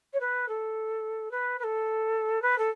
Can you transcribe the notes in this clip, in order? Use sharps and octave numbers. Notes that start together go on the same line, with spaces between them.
C#5
B4
A4
B4
B4
A4
B4
A4